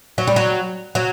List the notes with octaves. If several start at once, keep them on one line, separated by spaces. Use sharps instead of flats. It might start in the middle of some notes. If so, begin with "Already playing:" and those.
F#3
G3
F#3
F#3